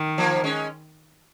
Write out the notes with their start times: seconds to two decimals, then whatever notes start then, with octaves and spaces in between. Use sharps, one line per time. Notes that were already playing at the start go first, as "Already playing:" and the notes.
Already playing: D#3
0.18 F3 A#3
0.44 G#3 C#4